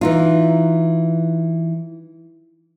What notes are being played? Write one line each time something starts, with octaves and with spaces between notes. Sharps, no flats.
E3 D#4 F4